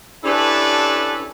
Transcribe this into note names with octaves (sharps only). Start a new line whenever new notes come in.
C#4 D4 E4 G4 A4 B4